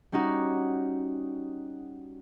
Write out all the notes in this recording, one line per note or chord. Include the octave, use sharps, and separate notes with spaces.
G3 C#4 D#4 F#4